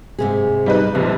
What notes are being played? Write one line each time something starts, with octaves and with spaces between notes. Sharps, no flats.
G#2 C3 G#4
G3 D#4 B4
A#1 F2 C3 D#4